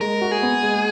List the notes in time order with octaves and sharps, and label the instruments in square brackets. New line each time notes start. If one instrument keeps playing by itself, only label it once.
[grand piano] G#3 [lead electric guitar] A#4
[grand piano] F#4
[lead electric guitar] G#4
[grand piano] B3
G#3